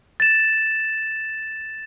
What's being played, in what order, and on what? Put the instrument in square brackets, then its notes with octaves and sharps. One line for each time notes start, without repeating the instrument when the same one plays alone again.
[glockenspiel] A6 E7